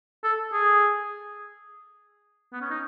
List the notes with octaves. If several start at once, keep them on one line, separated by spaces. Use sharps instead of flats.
A4
G#4
B3
C#4
D#4